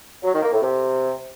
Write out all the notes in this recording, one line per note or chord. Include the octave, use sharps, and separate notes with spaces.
F#3
D#3
A#3
A2
C3